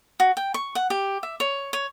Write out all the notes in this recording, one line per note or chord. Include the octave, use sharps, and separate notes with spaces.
F#4
G5
C#6
F#5
G4
E5
C#5
C#5